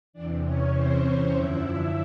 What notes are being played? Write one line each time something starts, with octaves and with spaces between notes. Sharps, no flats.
E2 C3 E3 D4 D5
C#4 C#5
C4 C5
F#2 D3 F3 E4 E5